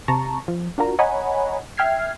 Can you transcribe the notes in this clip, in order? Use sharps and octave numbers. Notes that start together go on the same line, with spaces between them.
C3 A5 A#5 C#6
F3
D4 F4 F#4 A#4 A#5
C#5 D#5 F#5 G#5 A#5 B5
E5 G5 F6 G#6 C7